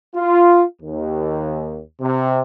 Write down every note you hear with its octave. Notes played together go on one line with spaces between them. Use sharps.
F4
D#2
C3